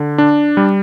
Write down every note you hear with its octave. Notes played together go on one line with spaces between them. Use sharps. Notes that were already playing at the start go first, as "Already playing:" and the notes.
Already playing: D3
D4
G3